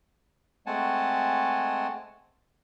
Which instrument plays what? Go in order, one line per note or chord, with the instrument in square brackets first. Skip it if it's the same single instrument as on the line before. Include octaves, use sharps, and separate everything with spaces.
[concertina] G#3 A3 C4 F#5 G#5 A5